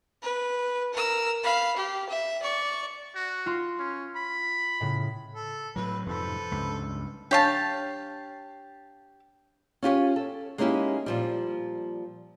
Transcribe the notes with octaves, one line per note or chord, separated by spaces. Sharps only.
B4
A#4 E6
F5 B5
G4
E5
D5 C#6
F#4
F4 C6
C#4
B5
A2 C#3
A4
A2 F#3 B4
F2 G#2 C3 A4 B4 C5
C#2 G2
D4 G4 C#5 F5 A5 C#6
C#4 F4 G4 C#5
A4
G#3 A#3 C#4 D#4 E4 G4
A#2 F3 G3